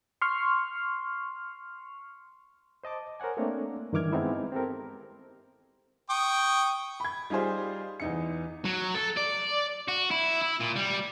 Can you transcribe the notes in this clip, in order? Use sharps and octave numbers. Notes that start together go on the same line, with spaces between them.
C6 C#6 F6
C5 D#5 A5 D6
A#4 C5 C#5 F#5 G#5
A3 A#3 C4 D4 C#5
G2 D#3 E3 D6 F6 G#6
G#3 B3 C4 D#4 E4
C4 G4 A4 A#4
G5 C#6 D#6
B5 G#6
G3 D#4 F4 G4 G#4 C5
E2 D#4 C#7
F#3
A4
D5
F#4
E4
E4
A#2
G3